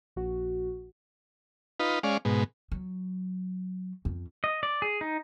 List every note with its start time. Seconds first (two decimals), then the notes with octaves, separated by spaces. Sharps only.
0.16 A#1 F#4
1.80 D#4 F4 B4
2.03 G#3 C#4 D5 F5
2.25 G#2 B2
2.72 F#3
4.05 F2
4.44 D#5
4.63 D5
4.82 G#4
5.01 D#4